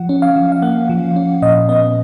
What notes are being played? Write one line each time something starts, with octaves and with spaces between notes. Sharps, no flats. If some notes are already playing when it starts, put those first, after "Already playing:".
Already playing: F3 F#5
C#4
F5
F3
F5
A#3 F#5
F3
C#4
A#2 D#5
B3 D#5